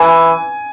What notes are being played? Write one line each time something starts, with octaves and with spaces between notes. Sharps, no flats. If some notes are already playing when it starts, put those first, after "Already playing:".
Already playing: E3 G#5